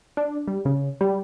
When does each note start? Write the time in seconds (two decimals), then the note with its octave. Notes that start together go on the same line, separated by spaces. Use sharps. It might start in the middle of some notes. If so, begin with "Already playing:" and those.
0.17 D4
0.48 G3
0.65 C#3
1.01 G3